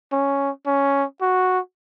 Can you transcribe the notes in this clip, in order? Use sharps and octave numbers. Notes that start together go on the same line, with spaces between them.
C#4
C#4
F#4